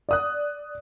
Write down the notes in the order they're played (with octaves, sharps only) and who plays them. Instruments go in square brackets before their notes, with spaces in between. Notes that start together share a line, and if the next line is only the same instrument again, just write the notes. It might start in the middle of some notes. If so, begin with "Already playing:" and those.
[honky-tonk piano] D5 D#6 F#6